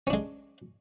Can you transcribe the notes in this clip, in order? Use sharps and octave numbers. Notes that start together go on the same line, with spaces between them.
G#3 C#4 D4